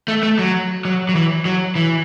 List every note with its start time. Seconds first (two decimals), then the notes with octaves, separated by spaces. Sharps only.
0.08 A3
0.23 A3
0.39 F#3
0.85 F#3
1.09 F#3
1.15 E3
1.45 F#3
1.76 E3